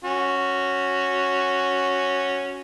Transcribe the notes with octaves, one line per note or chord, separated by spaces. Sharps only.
C#4 F#4